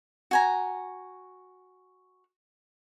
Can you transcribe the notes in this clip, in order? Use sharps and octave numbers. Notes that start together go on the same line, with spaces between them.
F#4 G#5 A#5